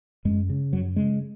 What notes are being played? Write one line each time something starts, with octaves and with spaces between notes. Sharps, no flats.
F#2 G#3
C#3
F#2 F#3
C#3 G#3